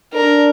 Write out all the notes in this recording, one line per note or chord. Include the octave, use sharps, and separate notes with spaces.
D4 A#4